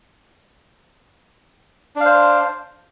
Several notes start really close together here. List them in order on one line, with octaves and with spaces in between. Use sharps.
D4 F5 C5